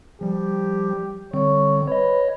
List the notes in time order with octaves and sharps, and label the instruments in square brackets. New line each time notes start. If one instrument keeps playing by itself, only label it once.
[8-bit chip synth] F3 G3 [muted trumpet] G4
[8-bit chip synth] D3 G3 C4 [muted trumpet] C#5
[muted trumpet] B4 [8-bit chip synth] C#5 D#5